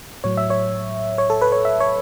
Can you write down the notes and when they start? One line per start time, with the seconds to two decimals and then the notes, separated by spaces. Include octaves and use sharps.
0.24 A2 F#3 C#5
0.37 E5
0.50 C#5
1.18 C#5
1.30 A4
1.41 B4
1.52 C#5
1.65 E5
1.80 C#5